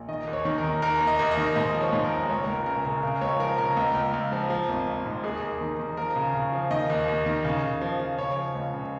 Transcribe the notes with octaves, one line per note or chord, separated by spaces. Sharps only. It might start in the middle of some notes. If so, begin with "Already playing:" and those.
Already playing: A#1
D#3 D#5
D#2
C#5
D#3
A#4
D#3
D#2 A#4
D#2
D#5
D#2
D#5
D#3
G#2 D#5
F3
C#5
G#2
A#4
A#1
C#2 C#5
C#2 A#4
C#3 A#4
C#3 A#4
C#3 A#4
C#2 C#5
F3 A#4
C#3 A#4
C#2
C#2
C#2
F3
F3
G#1
G#1
G#2
D#2 G#4
D#2
D#3
D#3
F3 A#4
C#3
C#3
F3
D#3 D#5
D#2
D#2
D#3
C#3
C#3
F3
F3
C#3 C#5
F3
C#2
C#3